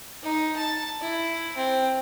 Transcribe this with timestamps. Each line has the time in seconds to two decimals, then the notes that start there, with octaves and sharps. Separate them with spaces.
0.23 D#4
0.57 A5
1.02 E4
1.56 C4